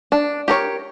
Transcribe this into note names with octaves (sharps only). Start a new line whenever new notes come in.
D4
G4 A#4 C#5